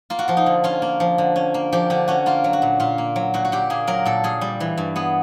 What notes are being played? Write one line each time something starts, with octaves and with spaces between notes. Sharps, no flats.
A#3 F4
F#4
F3 F4
D#4
D3
C#4 F4
A#3
F3
D3
C#4
A#3
F3 G4
D3 G4
C#4 F#4
A#3 F4
F#3
F#4
A#2
A#2 F4
A#3
F#3
A#2 F#4
F#4
A#2 G4
A#3 G#4
F#3 A#4
A#2 A4
A#2 G#4
G3
E3
G2
B3 G#4